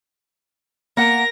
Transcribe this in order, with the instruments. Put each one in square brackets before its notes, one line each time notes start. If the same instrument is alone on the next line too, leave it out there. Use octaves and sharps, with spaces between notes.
[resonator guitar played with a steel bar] A#3 F#5 [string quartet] A#4 A#6